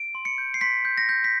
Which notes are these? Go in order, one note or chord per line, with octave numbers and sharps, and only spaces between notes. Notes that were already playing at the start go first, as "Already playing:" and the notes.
Already playing: D7
C6
C#7
G6
C7
C6 B6
G6
A#6
G6
B6